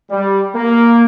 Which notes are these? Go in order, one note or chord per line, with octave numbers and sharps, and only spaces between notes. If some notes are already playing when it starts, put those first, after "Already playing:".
G3
A#3